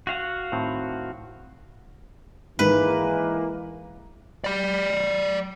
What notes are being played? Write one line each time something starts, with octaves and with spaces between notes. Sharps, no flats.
F#4 F5 F#5
A2 D#3 C4
G#2 D#3 E3 G#3 A#3 B4
D5 B5